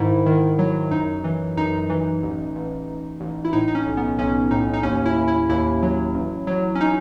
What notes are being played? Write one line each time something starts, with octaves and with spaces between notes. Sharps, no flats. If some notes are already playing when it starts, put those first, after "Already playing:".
Already playing: G#2 D#3 E4
D#3
F#3
F#2 D#4
E3
F#2 D#4
E3
A1
A1
A1
A1
E4
A2 D#4
D#4
C#4
B1
B3
B1 C#4
A2 D#4
D#4
D#2 C#4
E4
D#2
E4
D#2 E4
F#3
A1
F#3
C#4
D#4